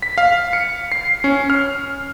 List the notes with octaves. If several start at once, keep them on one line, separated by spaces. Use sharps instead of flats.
B6
F5
C#7
C7
C#4
F6